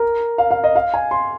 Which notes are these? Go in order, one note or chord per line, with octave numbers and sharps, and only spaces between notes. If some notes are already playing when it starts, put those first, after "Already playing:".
Already playing: A#4
F5
F5
D#5
F5
G#5
C6